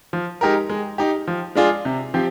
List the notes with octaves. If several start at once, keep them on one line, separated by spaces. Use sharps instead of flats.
F3
G#3 D#4 G4 A#4
G#3
D#4 G4
F3
G#3 D4 F4 G#4
C3
F3 C4 G4